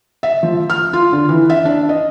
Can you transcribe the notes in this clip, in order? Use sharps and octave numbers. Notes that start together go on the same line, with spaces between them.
E5
F3
F6
F4
D3
E3
E5
D4
D#5